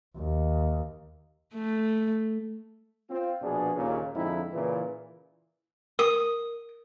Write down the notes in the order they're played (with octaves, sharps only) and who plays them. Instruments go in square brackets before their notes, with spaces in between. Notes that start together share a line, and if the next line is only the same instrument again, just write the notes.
[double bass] D#2
[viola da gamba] A3
[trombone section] C4 F4
A#1 B2 B3 D4 G#4
D#2 A#2 C#3
F2 G#2 D3 D#4 E4
A#2 C#3 E3
[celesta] A#4 [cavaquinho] D#6